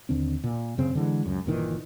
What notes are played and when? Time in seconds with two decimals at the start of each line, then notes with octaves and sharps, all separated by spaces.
0.09 D#2 D3 C4
0.44 A#2
0.78 F#2 C#3 C4
0.95 D3 E3 G#3
1.26 C#2 F#2
1.46 G1 A#2 D#3 E3